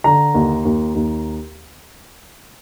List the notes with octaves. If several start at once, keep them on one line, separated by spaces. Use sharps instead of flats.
D3 A#5
D#2
D#2
D#2